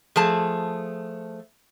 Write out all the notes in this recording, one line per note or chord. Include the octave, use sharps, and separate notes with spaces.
F3 A3 G#4 A5